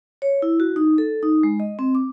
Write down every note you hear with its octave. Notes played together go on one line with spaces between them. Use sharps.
C#5
E4
F#4
D#4
A4
D#4
G#3
D#5
C4
D6